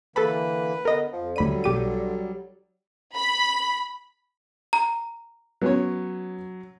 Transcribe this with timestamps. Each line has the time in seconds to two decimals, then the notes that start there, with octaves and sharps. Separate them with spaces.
0.16 D3 E3 A#3 A4 B4 A5 B5
0.85 D3 B3 A#4 D#5
1.12 F2 F3
1.36 D2 D3 F#3 G3 B5 D#7
1.64 B1 G4 D#7
3.17 B5
4.73 A#5
5.61 F#3 B3 C#4 C#5